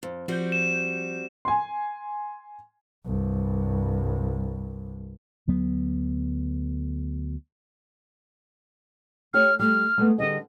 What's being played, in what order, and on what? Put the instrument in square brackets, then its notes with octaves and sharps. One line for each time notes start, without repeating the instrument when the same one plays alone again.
[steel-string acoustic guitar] F2
[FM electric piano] F3 G6 [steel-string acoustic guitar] G3 C4 F#4
[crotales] E7
[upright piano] G#5 C6
[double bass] C2 G2
[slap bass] D2 F#3 B3
[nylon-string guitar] A3 G4 C#5 [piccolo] F6
[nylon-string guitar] G3 A3 [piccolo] F6
[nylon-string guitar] G#3 A3 B3
[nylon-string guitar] D3 G3 G#4 [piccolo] D#5